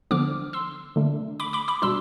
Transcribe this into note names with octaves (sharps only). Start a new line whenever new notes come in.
D3 F3 B3 D4 D6 F6
C6 E6
D3 A3 D4
B5 D6
B5 D6
B5 D6
B2 G3 D4 C6 E6